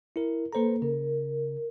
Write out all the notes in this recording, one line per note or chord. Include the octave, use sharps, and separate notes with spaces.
E4 A#4
A#3 A4 B4 C5 A#5
C#3 A#4